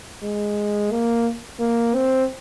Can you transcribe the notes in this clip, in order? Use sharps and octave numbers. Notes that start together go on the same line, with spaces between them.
G#3
A#3
A#3
C4